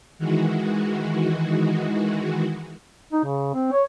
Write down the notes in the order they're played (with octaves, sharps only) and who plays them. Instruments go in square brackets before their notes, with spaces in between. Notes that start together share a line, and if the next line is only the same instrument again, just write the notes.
[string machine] D#3 E3 G#3 F#4
[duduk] D#4
C#3
C4
C#5